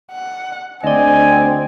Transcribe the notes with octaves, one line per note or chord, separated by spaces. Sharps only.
F#5
D2 C4 D5 D#5 G#5